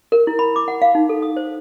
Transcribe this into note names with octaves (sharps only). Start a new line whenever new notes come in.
A#4
E4
B5
D6
F#5
F5
D#4
A4
D#6
C5